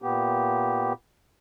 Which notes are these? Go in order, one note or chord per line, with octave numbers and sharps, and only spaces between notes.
A#2 B3 G4